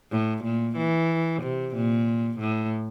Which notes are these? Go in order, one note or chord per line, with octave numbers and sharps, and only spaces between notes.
A2
A#2
E3
C3
A#2
A2